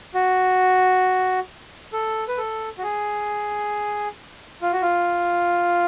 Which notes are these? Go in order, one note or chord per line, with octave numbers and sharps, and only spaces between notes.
F#4
A4
B4
A4
F#4
G#4
F4
F#4
F4